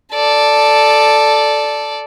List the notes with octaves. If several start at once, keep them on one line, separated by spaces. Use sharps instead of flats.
A4 D5